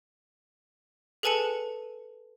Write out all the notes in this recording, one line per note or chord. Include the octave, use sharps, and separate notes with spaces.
G#4 A4 B4 G#5 A5 C#7